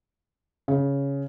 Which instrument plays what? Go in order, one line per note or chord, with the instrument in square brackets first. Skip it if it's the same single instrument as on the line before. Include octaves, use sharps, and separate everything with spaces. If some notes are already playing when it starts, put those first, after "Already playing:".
[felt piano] C#3